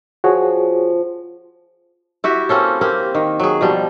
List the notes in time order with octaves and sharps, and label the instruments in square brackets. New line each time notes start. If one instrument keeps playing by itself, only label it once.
[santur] F3 [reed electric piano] F#4 G#4 C#5
[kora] E4 F#4 G4 E5
A#3 C4 C#4 A4
A#3 C4 G4
D#3
F#3 G#4
B2 F3 G3